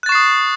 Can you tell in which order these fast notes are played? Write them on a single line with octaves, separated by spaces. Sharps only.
F#6 A6 C#6 C7 D#6